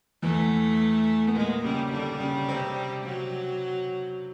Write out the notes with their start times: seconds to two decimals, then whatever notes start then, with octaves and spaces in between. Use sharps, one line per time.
0.22 E2 E3 A3
1.27 B3
1.36 A#2 G#3 A#3
1.64 C#3 G3 C#4
1.92 D3 G3 D4
2.20 C#3 C#4
2.48 C3 C4
3.05 F#3